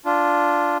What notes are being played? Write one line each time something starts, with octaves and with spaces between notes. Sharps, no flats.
D4 F4